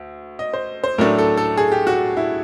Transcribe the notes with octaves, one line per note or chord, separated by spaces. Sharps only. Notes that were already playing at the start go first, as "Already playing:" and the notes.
Already playing: D2
D#5
C5
C5
A2 F#3 A3 D4 A#4
A4
A4
G#4
G4
F#4
E4